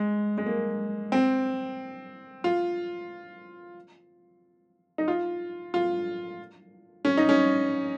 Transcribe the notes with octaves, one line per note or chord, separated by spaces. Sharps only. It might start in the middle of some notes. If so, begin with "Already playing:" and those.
Already playing: G#3
G#3
A#3
C4
F4
D#4
F4
F4
C#4
D#4
C#4